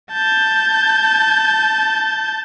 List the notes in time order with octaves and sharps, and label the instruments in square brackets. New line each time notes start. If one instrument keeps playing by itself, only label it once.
[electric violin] A5 G6